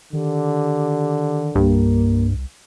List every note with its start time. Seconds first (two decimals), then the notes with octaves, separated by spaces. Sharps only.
0.13 D3 D#3 G4
1.55 C2 G2 A#3